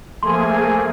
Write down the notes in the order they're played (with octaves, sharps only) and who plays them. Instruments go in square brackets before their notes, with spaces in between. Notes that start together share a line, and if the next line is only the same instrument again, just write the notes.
[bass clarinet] F3 [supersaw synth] A3 A#3 G#4 [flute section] G#5 [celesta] C6